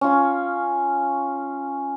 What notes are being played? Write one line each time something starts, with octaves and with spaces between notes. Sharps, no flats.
C#4 F4